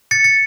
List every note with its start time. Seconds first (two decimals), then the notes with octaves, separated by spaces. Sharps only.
0.11 A6 C#7
0.24 A6 C#7